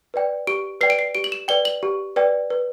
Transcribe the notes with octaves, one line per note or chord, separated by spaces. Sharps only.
B4 D5 G5
G4 D7
B4 D5 G5 C7
D7
C7
G4 D7
F#7
E7
B4 D5 G5 G7
F#7
G4
B4 D5 G5
B4